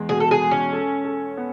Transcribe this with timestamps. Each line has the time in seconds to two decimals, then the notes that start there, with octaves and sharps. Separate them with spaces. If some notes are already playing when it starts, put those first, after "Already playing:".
Already playing: E2 G#3
0.09 B2 G#4
0.20 A4
0.31 G#4
0.41 G#3
0.51 C#4
0.73 A4
1.05 A4
1.37 B3